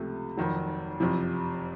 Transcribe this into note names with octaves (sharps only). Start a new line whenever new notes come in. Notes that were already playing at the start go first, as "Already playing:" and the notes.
Already playing: C#2 C3 F3 A3
F1 F2 D#3 F#3
F#1 F2 C3 F3